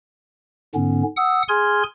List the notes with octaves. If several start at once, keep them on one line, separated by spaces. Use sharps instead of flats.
G#2 D3 B3 C#4
F#5 D#6 E6
G#4 G#5 C6 F6 G#6